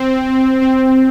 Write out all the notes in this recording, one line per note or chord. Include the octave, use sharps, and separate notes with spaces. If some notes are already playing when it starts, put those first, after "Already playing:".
Already playing: C4
C4